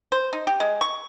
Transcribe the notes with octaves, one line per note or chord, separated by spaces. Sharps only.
C5
D#4
G4
G#3
C#6